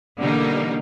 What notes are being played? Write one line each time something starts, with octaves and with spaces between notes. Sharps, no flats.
B2 D3 E3 G3 A#3 D#4